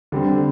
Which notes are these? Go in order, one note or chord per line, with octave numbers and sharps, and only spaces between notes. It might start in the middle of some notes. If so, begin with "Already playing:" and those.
D3 G3 C4